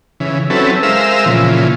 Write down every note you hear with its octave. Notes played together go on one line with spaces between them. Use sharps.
C#3 E3
F#3 C4 C#4 E4 A4 B4
G#3 A#4 C5 E5 F5 E6
A#2 C#3 E3 F3